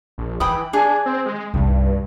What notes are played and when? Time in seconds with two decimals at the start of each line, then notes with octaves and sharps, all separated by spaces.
0.18 A#1
0.40 D#3 E3 G5 B5 D#6
0.73 D4 G#4
1.06 C4
1.25 G#3
1.54 C2 G2 D#3